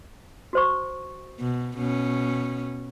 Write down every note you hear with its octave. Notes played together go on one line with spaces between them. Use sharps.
F#4 C5 C#6
B2
B2 C#4